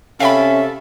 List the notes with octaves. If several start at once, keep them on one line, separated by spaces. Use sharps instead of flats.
C3 C#4 A4 E5 F5 G5 B5